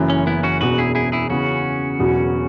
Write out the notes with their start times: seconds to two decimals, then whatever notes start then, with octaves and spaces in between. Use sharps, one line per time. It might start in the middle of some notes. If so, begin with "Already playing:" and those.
Already playing: F#1 F#2 E3
0.10 C#4
0.27 B3 E4
0.43 C#4 F#4
0.61 E1 E2 B2 F#4 B4
0.78 E4 G#4
0.95 E4 G#4
1.12 E4 G#4
1.30 C#3 E3 B3 C#4 F#4
1.99 E1 E2 B2 F#3 B3